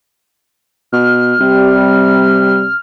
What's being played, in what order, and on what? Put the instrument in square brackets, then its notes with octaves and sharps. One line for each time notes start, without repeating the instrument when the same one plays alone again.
[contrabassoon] B2 [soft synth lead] F6
[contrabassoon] C3 [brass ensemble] G3